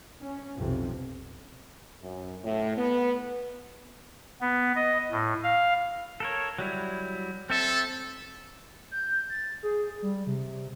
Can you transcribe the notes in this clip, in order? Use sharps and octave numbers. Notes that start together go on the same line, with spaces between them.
C#4
B1 F2 C3
F#2
A2
B3
B3
D#5
A2
F5
A4 A#4 C#5
F#3 G3 E4
C4 A4 E5
G6
A6
G#4
G3
C3